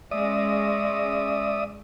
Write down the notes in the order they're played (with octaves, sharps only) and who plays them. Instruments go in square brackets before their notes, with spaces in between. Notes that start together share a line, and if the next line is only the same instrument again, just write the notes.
[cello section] G#3 C#4 [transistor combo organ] D5 E5 D#6